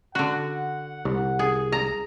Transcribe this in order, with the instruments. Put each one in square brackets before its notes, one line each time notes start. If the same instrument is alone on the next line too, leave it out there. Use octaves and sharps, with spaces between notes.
[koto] D3 F#4 [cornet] F#5
[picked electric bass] C2
[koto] G#4
A#5